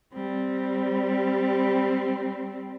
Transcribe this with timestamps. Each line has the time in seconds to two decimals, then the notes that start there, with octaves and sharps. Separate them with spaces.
0.13 G3 C4